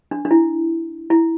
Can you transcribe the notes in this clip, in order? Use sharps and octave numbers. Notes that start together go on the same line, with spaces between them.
D4
D4
E4
E4